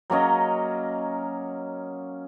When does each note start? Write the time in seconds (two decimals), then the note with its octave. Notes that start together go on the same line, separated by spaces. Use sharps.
0.10 F#3 A#3 C#4 D#5